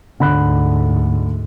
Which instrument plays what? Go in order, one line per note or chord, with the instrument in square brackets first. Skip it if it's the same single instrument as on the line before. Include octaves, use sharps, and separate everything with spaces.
[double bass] D2 G#2 [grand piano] D3 B5 F#6